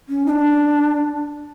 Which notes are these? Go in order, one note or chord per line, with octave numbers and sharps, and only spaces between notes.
C#4
D#4
D4